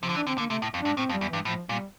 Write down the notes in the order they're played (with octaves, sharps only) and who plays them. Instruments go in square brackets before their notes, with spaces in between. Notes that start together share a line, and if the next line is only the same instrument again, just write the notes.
[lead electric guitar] C3 [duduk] F3
[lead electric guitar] D3
[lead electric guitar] E3 [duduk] D4
[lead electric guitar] D3 [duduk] C4
[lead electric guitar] D3 [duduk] A#3
[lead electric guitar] C3 [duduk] A3
[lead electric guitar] A2
F2
[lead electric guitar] G2 [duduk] D4
[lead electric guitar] A2 [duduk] C4
[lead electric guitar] F2
[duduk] G3
[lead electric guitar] E2
[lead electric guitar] G2 [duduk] E3
[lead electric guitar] A2 [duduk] F3
[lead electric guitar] A#2 [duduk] G3